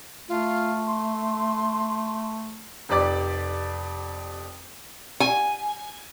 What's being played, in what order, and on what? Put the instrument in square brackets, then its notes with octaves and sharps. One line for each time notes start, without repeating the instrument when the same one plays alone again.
[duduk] A3 [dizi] F4
[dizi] C6
[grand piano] F1 F2 G4 D5 D6 A6
[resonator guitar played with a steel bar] G#5